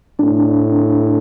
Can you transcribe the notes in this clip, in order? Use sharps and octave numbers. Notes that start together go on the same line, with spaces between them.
A2 D4